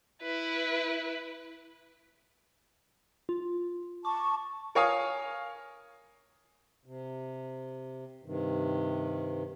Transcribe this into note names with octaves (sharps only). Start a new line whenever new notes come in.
E4 B4
F4
A5 C#6 D6
A#4 C#5 F5 G#5 D#6
C3
G2 C3 D#3